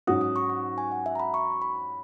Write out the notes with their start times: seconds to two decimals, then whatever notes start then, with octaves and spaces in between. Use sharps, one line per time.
0.07 G#2 F#3 C#4 F#4 D#6
0.21 D#6
0.36 C#6
0.50 C#6
0.78 G#5
0.92 F#5
1.06 E5
1.15 A#5
1.20 B5
1.34 C#6
1.62 B5